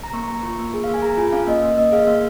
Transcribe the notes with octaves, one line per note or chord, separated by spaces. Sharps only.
A#5
A#3 C#6
A#3 A#5
F4 C#6
A#3
G#4
A#3 F5
G#5
G#4 A#5
F4 G#5
C#4 F5
A#3 D#5
A#3
A#3 D#5
G#4 F5
A#3 F5